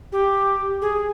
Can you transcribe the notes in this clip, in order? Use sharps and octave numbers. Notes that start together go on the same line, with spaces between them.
G4
G#4